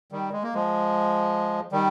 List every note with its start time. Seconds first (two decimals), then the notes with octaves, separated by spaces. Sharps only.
0.12 D#3 G3
0.32 G#3
0.43 A#3
0.54 F3 G#3
1.72 D#3 G3